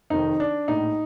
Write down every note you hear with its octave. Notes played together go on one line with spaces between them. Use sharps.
F1 F2 D#3 D#4
D4
A#1 A2 D#4